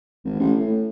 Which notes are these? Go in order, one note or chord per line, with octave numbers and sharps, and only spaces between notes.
G#1
A1
A2